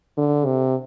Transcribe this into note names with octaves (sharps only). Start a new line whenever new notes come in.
D3
C3